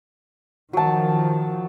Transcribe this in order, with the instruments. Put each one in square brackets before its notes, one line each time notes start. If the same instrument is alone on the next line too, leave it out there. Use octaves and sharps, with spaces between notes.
[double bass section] D#3 F3 [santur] F#3 A5